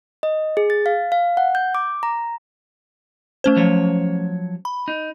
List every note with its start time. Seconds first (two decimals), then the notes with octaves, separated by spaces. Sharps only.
0.23 D#5
0.57 G#4
0.70 A6
0.86 F5
1.12 F5
1.37 F#5
1.55 G6
1.75 D6
2.03 A#5
3.44 A3 C#4 C5
3.56 F3 F#3 C#5
4.65 B5
4.88 D#4